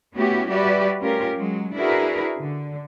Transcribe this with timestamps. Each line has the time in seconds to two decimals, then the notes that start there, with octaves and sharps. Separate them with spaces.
0.14 A3 B3 C#4 E4 F#4 G4
0.48 G3 F#4 G4 B4 D5 E5
1.00 A3 C#4 F4 G4 A#4
1.36 F#3 G#3
1.75 D4 E4 F#4 G#4 A#4 B4
2.39 D3